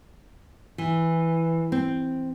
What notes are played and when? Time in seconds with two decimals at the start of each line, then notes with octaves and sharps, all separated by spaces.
0.78 E3
1.72 C4